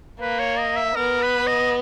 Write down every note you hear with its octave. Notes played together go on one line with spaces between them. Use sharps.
A#3 B4
C#5
D#5
E5
B3 A#4
B4
D#5